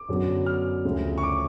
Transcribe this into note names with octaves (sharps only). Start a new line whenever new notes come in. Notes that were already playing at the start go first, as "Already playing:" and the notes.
Already playing: D6
F#2 D3 F#3 B3
F6
D2 C#3 F3 A3
C#6
D6